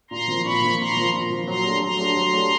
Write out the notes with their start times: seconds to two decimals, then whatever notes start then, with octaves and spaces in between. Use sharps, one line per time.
0.11 A#2 A#5 C6
0.28 F3 A#3
0.44 A#2 B5 C#6
0.61 F3 A#3
0.79 A#2 A#5 C6
0.96 F3 A#3
1.13 A#2
1.30 F3 A#3
1.47 F#3 A#5 C6
1.65 A3 D4 G4
1.82 F#3 A#5 C6
1.99 A3 D4 G4
2.17 F#3
2.33 A3 D4 G4